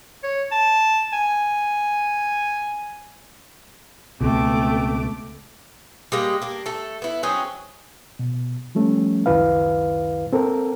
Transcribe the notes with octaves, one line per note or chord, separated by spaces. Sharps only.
C#5
A5
G#5
C#2 B2 A3 C4 D6
G3 G#3 A#3
A#3 D4
A3 A4
B3 E4
F#3 C4 C#4 G#4
B2
F3 G3 A3 C#4
C#2 F#2 D#3 E4 B4 F5
C4 A4 A#4